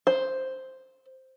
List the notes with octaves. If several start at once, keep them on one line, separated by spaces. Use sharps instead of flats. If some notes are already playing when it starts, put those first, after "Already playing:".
C5